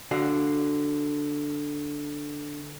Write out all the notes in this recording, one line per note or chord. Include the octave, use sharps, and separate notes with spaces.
D3 F#4 F5